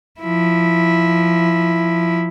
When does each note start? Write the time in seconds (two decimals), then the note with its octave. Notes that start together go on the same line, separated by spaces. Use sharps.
0.20 F3 E4